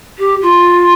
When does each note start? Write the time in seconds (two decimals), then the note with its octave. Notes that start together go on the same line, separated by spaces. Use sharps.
0.19 G4
0.42 F4